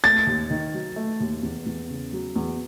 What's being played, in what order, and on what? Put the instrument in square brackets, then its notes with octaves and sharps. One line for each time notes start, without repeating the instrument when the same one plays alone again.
[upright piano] A3 [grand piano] A6
[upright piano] D#2
D#3
F#3
A3
D#2
E2
E2
C#3
F#3
E2